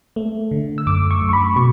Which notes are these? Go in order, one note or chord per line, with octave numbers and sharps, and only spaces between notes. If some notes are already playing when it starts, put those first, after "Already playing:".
A3
D3
E6
F#2 D6
C#6
F#2
C#6
B5
B2 C#6